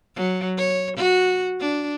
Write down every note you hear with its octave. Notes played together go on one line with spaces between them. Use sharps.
F#3
C#5
F#4
D4